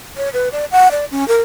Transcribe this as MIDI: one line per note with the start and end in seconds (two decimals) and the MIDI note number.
0.17 0.29 73
0.33 0.49 71
0.52 0.65 74
0.72 0.91 78
0.91 1.05 74
1.11 1.27 61
1.28 1.41 70